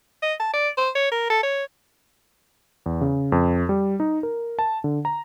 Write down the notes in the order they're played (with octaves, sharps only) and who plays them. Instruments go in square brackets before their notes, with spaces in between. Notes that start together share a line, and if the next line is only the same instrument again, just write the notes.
[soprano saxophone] D#5
A5
D5
C5
C#5
A#4
A4
C#5
[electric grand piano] E2
C#3
F2
G3
D#4
A#4
A5
D3
A#5